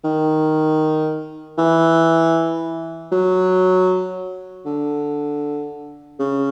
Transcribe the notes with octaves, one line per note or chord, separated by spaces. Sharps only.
D#3
E3
F#3
D3
C#3